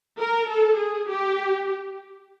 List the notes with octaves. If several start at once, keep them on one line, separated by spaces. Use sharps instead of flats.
A#4
A4
G#4
G4